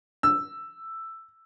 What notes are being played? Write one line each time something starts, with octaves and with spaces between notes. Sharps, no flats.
E6